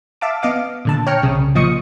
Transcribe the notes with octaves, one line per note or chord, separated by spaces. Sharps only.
E5 F5 A5 D6
B3 D#5 F5 D6
A#2 D3 A5
C#5 G5 A#5 F6 C#7
C2 C#3
A#2 F3 D#5 C#6 D#6 C#7